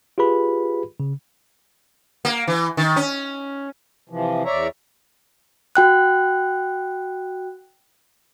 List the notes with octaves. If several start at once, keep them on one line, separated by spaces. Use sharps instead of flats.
F4 G4 G#4 B4 B5
C#3
A#3
E3
D#3
C#4
C3 E3 F3
E2 C#5 D5 E5 A#5
F#4 G5 F#6